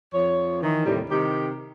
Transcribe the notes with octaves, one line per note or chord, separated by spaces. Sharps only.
F2 F3 C#5
D#3 E3
D#2 A2 C3 G3
C3 D#3 G4